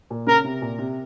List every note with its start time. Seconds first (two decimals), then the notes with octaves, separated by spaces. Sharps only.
0.10 A#2
0.27 C#3 A#4
0.44 C3
0.62 A#2
0.79 C3